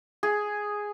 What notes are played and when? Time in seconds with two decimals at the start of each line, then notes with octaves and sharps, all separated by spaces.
0.23 G#4